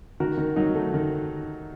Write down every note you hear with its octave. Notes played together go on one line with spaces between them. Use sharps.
D#3 F#4 A#4
D#3
F#3 D#4
A3
D#3